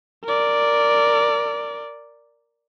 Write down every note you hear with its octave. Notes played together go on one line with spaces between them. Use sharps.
A#4 D5